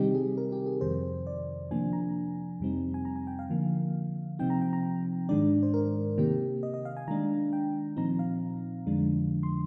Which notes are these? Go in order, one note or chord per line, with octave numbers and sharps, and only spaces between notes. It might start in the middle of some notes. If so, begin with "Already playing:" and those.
Already playing: C3 D#3 G3 C4 D#4 G4
G#4
A#4
G4
G#4
F2 C3 D#3 C5
D5
C3 F3 A#3 D4 G#5
A#5
F2 C3 G3 C4 D#4
G#5
A#5
G#5
G5
F5
D3 F3 A#3
C3 F3 C4 D#4 G5
A#5
G5
A#5
G#2 D#3 G#3 D4 D5
C5
A#4
C3 D#3 A#3 G4
D#5
D#5
F5
G#5
D#3 G#3 D4 A#5
G5
A#2 F3 C4 D#4 A#5
F5
F2 D3 F3 G#3 D4
C6